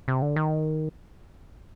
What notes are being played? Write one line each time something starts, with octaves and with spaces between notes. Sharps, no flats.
C3
D3
D#3